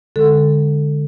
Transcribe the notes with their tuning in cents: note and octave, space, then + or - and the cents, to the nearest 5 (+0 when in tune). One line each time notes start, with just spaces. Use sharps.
D3 +0 G#3 +0 A4 +10